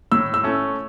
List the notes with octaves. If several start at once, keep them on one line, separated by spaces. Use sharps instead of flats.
A2 E6
E6
A3 C#4